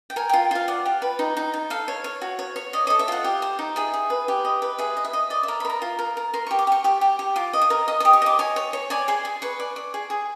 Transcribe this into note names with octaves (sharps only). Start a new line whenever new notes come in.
G5
A#4 G#5
F4 G5
F4 F5
D5 F#5
G4
B4
D#4
D#4
D#4
A4 F5
C#5
C#5
F#4
C#5
C#5
D5 D#5
A4 D#5
E5
F4 F#5
G4
C5
D#4
G#4 E5
G#4
B4
G4
D#5
B4
G#4 E5
D#5
E5
D#5
D5 D#5
A#4 E5
B5
A#4
A#5
F4
A#4
A#4
A#4 C6
G4 C#6
D6
G4 C#6
G4 D6
G4
G4
F4 D6
D#5
D#6
A#4
D#5 D#6
G4 D#6
C#6
D#5 D6
C#5 G#5
C#5
C#5
D5 G#5
G#4 C6
G#4
B4 C#6
D5
D5
G#4
G#4